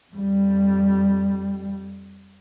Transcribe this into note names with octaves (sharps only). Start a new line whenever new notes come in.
F2 G3